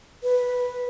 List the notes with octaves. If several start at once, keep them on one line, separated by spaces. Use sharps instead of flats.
B4